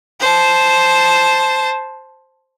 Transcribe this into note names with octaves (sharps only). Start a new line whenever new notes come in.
C5 A5